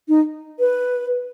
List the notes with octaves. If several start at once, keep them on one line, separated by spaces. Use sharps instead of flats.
D#4
B4